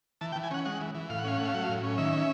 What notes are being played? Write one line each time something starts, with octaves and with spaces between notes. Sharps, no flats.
E3 A5
G5
E3
G#5
C#4 F#5
G#3 F#5
E3
E3
A2 F5
F#5
C#4 F5
A3 F#5
F5
F#3 F#5
F5
A2
C#4
D#3 E5
C#4